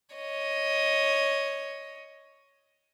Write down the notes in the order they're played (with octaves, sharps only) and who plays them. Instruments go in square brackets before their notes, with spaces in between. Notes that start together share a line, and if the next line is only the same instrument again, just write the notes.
[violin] C#5 D#5